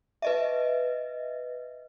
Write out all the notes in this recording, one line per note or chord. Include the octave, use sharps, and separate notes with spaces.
B4 D#5 E5